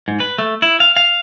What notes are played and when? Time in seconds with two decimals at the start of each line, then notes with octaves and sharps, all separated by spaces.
0.08 G#2
0.20 B4
0.39 A3
0.62 E4
0.80 F5
0.97 F5